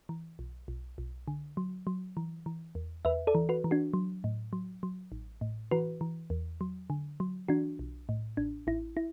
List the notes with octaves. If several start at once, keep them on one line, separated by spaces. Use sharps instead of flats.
E3
B1
B1
B1
D3
F#3
F#3
E3
E3
E2
E2 B4 E5
A4 D5
E3
F#4 B4
E3
D4 F#4
F#3
A2
F#3
F#3
A1
A2
E3 F#4 B4
E3
E2
F#3
D3
F#3
E3 D4 F#4
B1
A2
A1 D4
A1 E4
E4